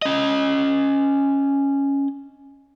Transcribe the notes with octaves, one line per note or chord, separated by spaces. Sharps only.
C#4 D#5